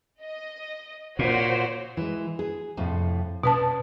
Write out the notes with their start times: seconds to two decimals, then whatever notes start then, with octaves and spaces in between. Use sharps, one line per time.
0.21 D#5
1.19 A#2 F#4 C5 C#5
1.97 E3 G#3
2.39 G#4
2.77 F2 A2 C3
3.43 B2 C#4 B4 D5 A5